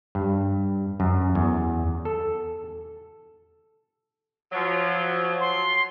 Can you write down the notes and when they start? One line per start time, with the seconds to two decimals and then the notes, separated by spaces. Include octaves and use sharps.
0.15 G2
1.00 F#2
1.35 E2
2.05 A4
4.52 F3 F#3
5.41 C6